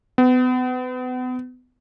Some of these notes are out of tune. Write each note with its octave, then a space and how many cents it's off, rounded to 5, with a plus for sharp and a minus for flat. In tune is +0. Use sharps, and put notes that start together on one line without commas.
B3 +35